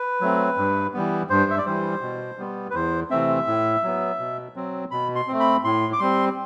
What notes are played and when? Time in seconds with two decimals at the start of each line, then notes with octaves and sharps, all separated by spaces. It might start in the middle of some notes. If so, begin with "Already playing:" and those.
Already playing: B4
0.21 F#3 A3 C4
0.58 G2
0.94 E3 G3 B3
1.30 G2 C5
1.50 E5
1.58 D5
1.66 E3 G3 C5
2.02 B2
2.38 G3 B3
2.70 B4
2.74 E2 C5
3.10 C3 E3 A3 C4 E5
3.47 A2
3.83 F#3 B3
4.19 B2
4.56 F#3 C4
4.91 B2 B5
5.15 C6
5.28 A3 C4
5.40 B5
5.64 A2 C6
5.93 D6
6.00 G3 C4 C6